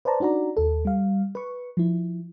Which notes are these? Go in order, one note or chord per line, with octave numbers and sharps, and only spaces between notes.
B4 C5 D5 A5 A#5
D4 D#4 F#4 D5 A#5
D#2 A4
G3 F5
B4 C#6
F3 E4